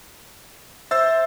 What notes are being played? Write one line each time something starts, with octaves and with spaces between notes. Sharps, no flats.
C5 E5 E6 A6